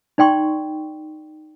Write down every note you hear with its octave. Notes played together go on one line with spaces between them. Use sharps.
D#4 D5 G5 C6 C#6